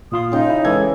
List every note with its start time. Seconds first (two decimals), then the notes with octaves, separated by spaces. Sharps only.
0.12 A#2 F4 C6 D#6
0.32 C#3 D#4 G5
0.50 E4
0.65 E3 G#3 A4 G#6